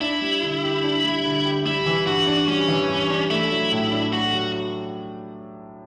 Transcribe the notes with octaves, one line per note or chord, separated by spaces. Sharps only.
D4 E4
G3
D3
G4
D4
G3
D3
G4
G3 E4
E3
G2 F#4
D4
G3 C#4
E3
G2
D4
A3 E4
F#3
A2
D4
A3 F#4
F#3